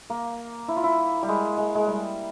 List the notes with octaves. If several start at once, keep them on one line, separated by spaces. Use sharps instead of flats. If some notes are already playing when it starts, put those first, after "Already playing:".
A#3
E4
F4
E4
G3
G#3
G#3
G#3
G3